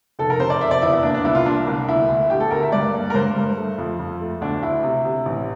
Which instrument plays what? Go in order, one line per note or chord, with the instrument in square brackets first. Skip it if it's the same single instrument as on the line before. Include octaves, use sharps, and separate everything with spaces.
[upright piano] F1 A4
A#4
C3 C5
D5
F1 E5
D5
E2 E4
E4
A#3 D4
D4
C2 E4
F4
A#3 D4
C2
D2 E4
D2
D2 G4
A4
D2 A#4
E5
G2 D5
A#3
A#4
G2 C5
G2
A3
F2
F2
A3
D2 D4
D2 E4
C3
C3
A1